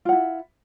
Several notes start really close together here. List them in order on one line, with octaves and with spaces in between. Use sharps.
F4 F#5 E4